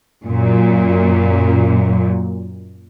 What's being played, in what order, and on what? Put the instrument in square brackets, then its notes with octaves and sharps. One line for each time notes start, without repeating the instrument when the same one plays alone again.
[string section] F#2 A#2